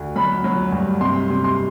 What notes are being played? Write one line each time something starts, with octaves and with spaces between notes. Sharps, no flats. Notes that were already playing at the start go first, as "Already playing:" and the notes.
Already playing: D2
F#3 B5
F#3
G2
C3 C6
C3
C6